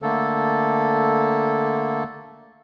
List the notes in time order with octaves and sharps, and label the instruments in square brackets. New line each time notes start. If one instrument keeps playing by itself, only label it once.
[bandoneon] D3 A3 A#3 A4